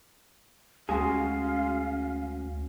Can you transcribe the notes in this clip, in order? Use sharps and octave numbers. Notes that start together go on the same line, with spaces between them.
D2 G#3 C#4 F#4 G#4 F5